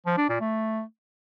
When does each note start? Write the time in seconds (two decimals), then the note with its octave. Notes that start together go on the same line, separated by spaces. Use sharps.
0.06 F3
0.18 D4
0.29 A#2
0.41 A3